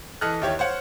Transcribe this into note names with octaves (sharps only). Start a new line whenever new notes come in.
E3 A4 D#5 F6 F#6
D#2 E4 G4 C#5
C5 C#5 F#5